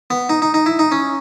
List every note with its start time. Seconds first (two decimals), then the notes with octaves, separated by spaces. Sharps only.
0.10 B3
0.29 D#4
0.42 D#4
0.54 D#4
0.66 E4
0.79 D#4
0.92 C#4